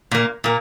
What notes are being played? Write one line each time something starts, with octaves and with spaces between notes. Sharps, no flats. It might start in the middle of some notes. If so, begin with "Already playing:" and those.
A#2 A#3
A#2 A#3